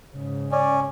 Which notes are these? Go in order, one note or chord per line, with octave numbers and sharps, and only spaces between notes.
G#2 C#3
C#4 D5